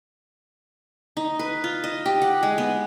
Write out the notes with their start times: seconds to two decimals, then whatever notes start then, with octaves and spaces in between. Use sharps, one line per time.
1.17 D#4
1.39 B4
1.64 F4
1.84 D#5
2.06 G4
2.22 F#5
2.43 G#3
2.58 B3